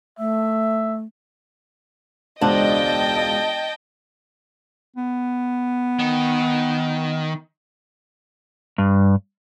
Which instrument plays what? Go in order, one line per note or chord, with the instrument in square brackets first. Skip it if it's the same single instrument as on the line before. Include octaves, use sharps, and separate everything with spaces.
[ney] A3 [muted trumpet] E5
[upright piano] E1 C#2 C5 [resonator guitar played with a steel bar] D4 [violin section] D#5 G5 A5
[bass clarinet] B3
[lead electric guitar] D#3
[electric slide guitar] G2